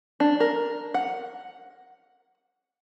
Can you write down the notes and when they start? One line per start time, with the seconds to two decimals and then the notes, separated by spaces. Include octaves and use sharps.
0.20 D4
0.40 A#4
0.94 F#5